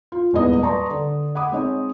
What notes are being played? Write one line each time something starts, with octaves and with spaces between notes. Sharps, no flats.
F4
D#1 E2 G#2 B4 D#5 D#6
B4 D5 A5 A#5 C6 C#6
D3
F#5 B5 D6 D#6
G#3 C4 D#4 C#5 D#5